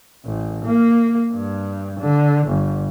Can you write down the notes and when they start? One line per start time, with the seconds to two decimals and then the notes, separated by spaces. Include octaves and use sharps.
0.25 A1
0.66 A#3
1.32 G2
2.00 D3
2.48 G1